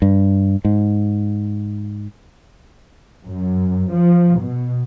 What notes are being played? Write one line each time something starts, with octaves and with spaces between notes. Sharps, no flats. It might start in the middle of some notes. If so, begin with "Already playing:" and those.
G2
G#2
F#2
F3
B2